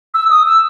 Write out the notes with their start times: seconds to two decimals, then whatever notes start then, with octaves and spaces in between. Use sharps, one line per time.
0.14 E6
0.31 D#6
0.47 E6